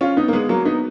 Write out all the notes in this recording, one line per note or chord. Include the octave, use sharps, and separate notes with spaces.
C#4 F4
B3 D#4
A#3
G#3 B3
F#3 A#3
B3 D#4